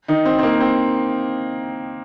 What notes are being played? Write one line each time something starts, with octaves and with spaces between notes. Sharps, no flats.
D#3 D#4
C4
C4
A#3
C4